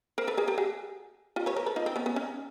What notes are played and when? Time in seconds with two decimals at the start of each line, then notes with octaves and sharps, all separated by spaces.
0.18 A#4 C5
0.27 A4 B4
0.37 G#4 A#4
0.48 G4 A4
0.58 F#4 G#4
1.36 F4 G4
1.46 B4 C#5
1.56 A#4 C5
1.66 A4 B4
1.76 D#4 F4
1.86 C4
1.96 B3 C#4
2.06 B3 C#4
2.16 C#4 D#4